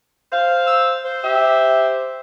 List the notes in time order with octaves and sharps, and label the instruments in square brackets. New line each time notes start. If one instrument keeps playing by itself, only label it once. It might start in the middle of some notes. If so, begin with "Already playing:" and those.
[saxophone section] C5 F5
[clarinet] E6
C5
[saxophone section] G4 E5